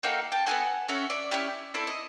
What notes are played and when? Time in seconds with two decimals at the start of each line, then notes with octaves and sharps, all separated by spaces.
0.03 A#3 D#4 F#4 A4 F5 G5
0.32 G5 A5
0.46 B3 D#4 F#4 A4 F#5 G#5
0.88 C#4 F#4 A4 E5 F#5
1.10 D5 E5
1.31 C#4 E4 G4
1.74 C4 E4 A4 D5
1.87 D#5